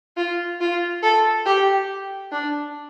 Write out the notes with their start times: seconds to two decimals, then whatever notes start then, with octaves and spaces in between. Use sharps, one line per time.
0.17 F4
0.61 F4
1.03 A4
1.46 G4
2.31 D4